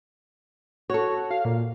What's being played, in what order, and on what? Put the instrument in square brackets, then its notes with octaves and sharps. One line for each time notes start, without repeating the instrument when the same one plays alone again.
[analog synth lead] F#4 [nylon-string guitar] A4 C#5
[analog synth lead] F5
A#2